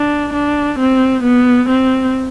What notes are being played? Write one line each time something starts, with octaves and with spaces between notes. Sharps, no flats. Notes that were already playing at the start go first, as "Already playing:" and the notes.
Already playing: D4
D4
C4
B3
C4